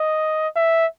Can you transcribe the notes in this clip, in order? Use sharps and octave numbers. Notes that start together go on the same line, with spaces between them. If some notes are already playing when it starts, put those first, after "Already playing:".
Already playing: D#5
E5